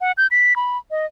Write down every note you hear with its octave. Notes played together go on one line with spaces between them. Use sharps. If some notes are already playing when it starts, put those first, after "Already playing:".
F#5
G6
B6
B5
D#5